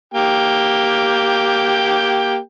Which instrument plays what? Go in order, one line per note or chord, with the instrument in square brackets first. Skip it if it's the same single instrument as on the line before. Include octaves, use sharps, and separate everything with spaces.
[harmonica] A#3 G4 G5